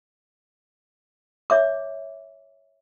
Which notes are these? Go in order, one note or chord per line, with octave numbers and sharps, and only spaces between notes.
C#5 E5 D6